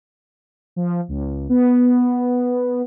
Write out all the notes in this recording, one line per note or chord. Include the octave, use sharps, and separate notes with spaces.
F3
C#2
B3